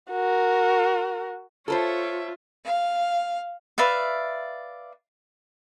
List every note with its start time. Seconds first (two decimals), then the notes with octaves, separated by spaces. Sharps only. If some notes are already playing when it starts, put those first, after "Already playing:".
0.11 F#4 A#4
1.68 F4 A4 A#4 C5 C#5 E5
2.64 F5
3.78 B4 D5 E5 F5